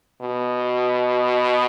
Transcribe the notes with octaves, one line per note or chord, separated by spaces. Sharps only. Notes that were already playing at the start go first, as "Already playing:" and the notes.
B2